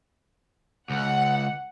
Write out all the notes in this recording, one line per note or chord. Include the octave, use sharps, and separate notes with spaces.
C#2 F#5